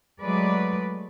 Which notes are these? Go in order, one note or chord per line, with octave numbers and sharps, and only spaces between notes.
F#3 G#3 A3 B4 D5